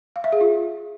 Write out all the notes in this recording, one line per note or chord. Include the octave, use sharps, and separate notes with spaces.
F5
E5
G#4
F4